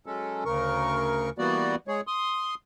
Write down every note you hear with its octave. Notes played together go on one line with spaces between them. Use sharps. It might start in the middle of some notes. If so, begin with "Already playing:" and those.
F#3 G#3 C#4 A4
D2 C#3 A#4 C#6
E3 G3 A#3 B3 F#4 D5
G#3 G#4 C#5
C6 D#6